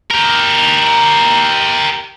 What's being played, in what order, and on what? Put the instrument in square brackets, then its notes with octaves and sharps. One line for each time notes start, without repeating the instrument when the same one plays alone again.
[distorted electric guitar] G4 A#4